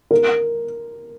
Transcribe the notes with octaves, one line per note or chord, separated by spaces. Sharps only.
A#4